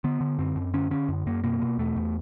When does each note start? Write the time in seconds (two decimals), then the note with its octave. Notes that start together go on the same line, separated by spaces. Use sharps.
0.04 D3 B3
0.21 D3
0.39 F#2 C4
0.56 F#2
0.74 D3 C#4
0.90 D3 C#4
1.09 F#2
1.27 F#2 A#3
1.44 B2 A#3
1.62 B2
1.78 E2 A3
1.96 E2